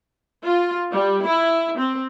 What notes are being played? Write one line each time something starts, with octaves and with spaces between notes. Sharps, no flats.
F4
G3
E4
C4